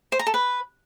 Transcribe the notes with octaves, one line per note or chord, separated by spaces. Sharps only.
C5
A#5
A4
B4